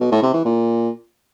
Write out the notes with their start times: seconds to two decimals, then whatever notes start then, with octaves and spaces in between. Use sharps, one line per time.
0.01 B2
0.12 A2
0.23 C3
0.34 E3
0.45 A#2